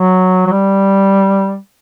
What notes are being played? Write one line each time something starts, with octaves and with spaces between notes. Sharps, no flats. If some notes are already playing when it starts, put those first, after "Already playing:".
Already playing: F#3
F#3
G3